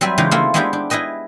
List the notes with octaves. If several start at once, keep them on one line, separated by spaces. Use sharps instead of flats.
F#3 G3 C4 B4 E5 G#5
C#3 E3 G#3 D#4 F4 G4
A3 A#3 C4 E4 F4 F5
G#3 B3 C4 D4 E4 G4
D4
E4 G#4 B4 D#5 G5